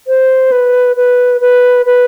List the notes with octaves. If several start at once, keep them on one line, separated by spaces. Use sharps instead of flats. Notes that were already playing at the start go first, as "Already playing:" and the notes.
C5
B4
B4
B4
B4